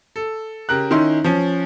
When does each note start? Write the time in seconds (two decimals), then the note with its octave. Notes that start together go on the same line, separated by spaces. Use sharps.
0.16 A4
0.69 C#3 G4 A#4 F#6
0.91 D#3 C#4 D#4 E4 C6
1.24 F3 C#4